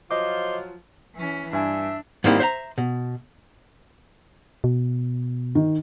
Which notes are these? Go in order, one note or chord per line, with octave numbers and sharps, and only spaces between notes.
F3 F#3 F4 C5 D#5 D6
E3 C#4
G2 D4 E5 G#5
G#2 D#3 G3 A#3 C4 E4
C5 E5 F#5 A#5
B2
B2
D#3